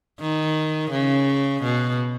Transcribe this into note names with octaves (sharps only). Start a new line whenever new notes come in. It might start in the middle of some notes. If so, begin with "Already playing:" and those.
D#3
C#3
B2